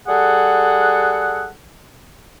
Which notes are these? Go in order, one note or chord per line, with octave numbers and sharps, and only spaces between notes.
G3 G#4 A4 F#5